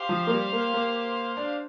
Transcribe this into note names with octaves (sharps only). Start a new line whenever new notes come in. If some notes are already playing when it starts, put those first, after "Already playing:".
Already playing: G4 C5 F5
F3
A#3
G3
A#3
A#3
D4